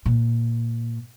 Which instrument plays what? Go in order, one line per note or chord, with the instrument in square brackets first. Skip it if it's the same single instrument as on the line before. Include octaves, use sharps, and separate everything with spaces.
[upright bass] A#2